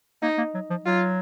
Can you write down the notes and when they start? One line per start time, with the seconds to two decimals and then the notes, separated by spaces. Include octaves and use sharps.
0.22 A#3 D#4
0.38 A#3
0.54 F#3
0.70 F3
0.86 F#3 F4